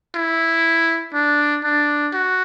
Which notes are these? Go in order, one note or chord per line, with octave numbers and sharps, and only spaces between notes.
E4
D4
D4
F#4